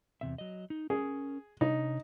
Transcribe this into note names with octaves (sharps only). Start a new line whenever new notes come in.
E2 C3 E5
F#3 D#5
D#4
C#4 G#4 A#4
C3 D4 D#4 C#5